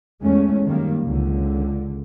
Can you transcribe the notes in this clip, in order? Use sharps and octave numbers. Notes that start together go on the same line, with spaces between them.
E2 G#3 A3 C#4
F#2 D#3 G3 A#3
C#2 D3